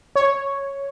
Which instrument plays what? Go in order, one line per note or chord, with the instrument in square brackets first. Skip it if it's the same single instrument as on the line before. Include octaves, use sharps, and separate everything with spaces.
[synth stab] C#5